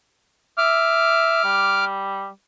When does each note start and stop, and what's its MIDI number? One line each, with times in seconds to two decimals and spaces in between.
0.58 1.41 76
0.58 1.85 86
0.58 1.85 89
1.44 2.29 55